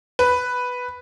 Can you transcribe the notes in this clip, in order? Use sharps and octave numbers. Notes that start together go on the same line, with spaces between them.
B4